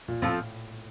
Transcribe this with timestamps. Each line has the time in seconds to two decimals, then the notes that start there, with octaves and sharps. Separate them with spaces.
0.08 A#2
0.22 A2 F3 C4 F4 A4